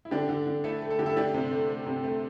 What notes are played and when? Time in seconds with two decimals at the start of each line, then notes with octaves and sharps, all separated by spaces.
0.05 E4
0.11 D3 D4 G4
0.29 D3
0.47 D3
0.64 A3 E4 A4
0.82 A3
0.90 A4
0.99 D3 G4
1.06 E4 A4
1.16 A3 D4 G4
1.34 C3
1.51 A3
1.69 A3
1.86 C3
2.04 A3